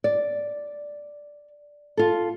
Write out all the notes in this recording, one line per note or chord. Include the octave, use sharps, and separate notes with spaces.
D5
F4 A4